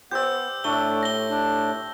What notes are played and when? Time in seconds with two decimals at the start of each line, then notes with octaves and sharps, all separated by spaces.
0.11 B3 G4 C5 D5 E6 G6
0.64 A2 A3 D4 A4 G7
1.03 A#6 G7
1.29 D4